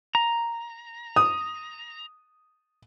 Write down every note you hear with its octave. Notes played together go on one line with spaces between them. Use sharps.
A#5
D#6